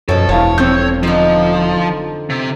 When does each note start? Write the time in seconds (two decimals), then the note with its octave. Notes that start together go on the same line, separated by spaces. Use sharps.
0.09 F#2 B2 F3 A4 C#5
0.29 E1 E4 C#5 F5 A5
0.58 F2 C4 A4 G6
1.03 D3 F3 D#4
2.30 C3